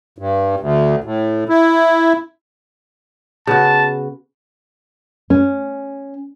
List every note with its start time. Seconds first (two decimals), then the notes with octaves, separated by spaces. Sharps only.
0.18 G2
0.60 D2
1.04 A2
1.49 E4
3.47 C#3 B3 F#4 A5
5.30 C#4